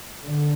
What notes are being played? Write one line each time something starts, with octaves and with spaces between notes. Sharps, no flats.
D3